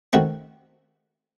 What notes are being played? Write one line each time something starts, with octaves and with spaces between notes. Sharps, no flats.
D#3 A3 C4 F#4